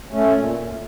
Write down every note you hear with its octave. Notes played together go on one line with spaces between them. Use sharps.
A3 C#4
A#2